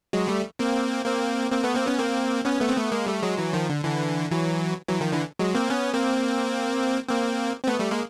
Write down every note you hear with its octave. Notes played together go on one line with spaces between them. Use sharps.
F#3 G#3
G3 A3
A#3 C4
A#3 C4
A#3 C4
A3 B3
A#3 C4
B3 C#4
A#3 C4
B3 C#4
A3 B3
C4
A3 B3
G#3 A#3
G3 A3
F#3 G#3
E3 F#3
D#3 F3
D3
D3 E3
E3 F#3
E3 F#3
D#3 F3
D3 E3
F#3 G#3
A#3 C4
B3 C#4
A#3 C4
A#3 C4
C4
A3 B3
G3 A3
G#3 A#3